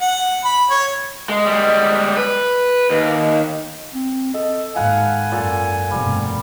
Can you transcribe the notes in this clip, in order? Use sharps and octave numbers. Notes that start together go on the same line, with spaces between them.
F#5
B5
C#5
G#3
G3 G#3
B4
D#2
C4
A4 D#5
D#2 G#2 F5 F#5 G#5 B5
F#2 A#2 A4
F1 G2 B2 G3